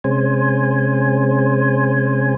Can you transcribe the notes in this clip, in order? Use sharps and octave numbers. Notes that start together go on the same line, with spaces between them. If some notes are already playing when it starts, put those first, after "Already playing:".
C3 G#3 C#4 C5 G#5